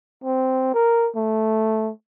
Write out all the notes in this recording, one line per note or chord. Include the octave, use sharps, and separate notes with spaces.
C4
A#4
A3